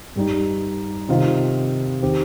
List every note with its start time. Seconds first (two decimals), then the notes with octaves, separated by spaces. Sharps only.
0.16 G2 G3 D#4
1.09 C3 D#3 C4 F4 D#5
2.02 D#3 C4 G4